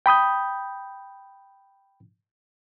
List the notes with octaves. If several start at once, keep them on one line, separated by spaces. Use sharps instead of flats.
G5 B5 D#6 G6